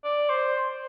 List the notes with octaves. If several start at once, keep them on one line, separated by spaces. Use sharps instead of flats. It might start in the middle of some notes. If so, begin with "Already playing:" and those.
D5
C5